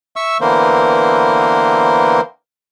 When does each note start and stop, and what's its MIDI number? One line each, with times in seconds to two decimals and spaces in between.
0.16 0.37 76
0.16 0.37 85
0.16 0.37 88
0.41 2.21 50
0.41 2.21 52
0.41 2.21 58
0.41 2.21 59
0.41 2.21 70
0.41 2.21 72